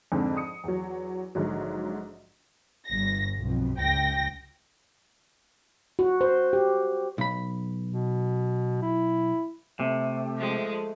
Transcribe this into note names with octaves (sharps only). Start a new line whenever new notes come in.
F2 G#2 D3 C4 D4
D#6 C#7
E2 F#3
A#1 G#2 D3 F#3
G1 A#6
B1 F2
C#2 G5 A#6
F#4
C5
G4
B1 B5
B2
E4
C3 A3
F3 G#3